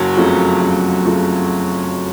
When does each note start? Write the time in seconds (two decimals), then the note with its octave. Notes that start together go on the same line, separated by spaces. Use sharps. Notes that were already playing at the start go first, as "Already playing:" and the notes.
Already playing: F#1 F#3
0.17 F2 C#3 F3 A3
0.61 F#1
1.05 F2 C#3 F3 A3